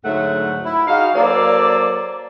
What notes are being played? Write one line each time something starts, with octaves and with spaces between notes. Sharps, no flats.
D2 G#2 F#3 A3 E5 F#5
E4
D#4 F#4 G#4 F5
F#3 A#3 A4 C5 D5